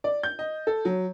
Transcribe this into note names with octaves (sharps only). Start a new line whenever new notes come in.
D5
G6
D#5
A4
F#3